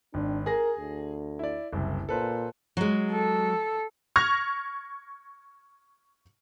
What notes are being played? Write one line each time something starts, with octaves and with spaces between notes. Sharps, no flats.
G#1 D4
G#4 A#4 A#6
D2
E4 D5
F#1 C2
A#2 A4 B4 C5
F#3 G#3
A4
C#6 F6 G#6 A#6